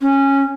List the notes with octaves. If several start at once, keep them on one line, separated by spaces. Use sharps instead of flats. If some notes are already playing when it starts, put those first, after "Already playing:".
C#4